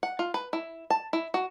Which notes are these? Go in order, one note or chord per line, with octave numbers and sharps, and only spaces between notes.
F#5
F4
B4
E4
A5
E4
F#4